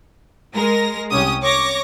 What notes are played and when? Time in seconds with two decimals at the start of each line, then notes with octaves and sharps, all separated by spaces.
0.53 G#3 A#4 A#6
1.10 C2 C#4 G4 D#6
1.42 C#5 C#6 D6 A#6